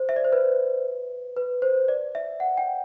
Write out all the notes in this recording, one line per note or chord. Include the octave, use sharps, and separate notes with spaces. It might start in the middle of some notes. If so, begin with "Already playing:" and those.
Already playing: C5
E5
D5
C5
B4
B4
C5
D5
E5
F#5
G5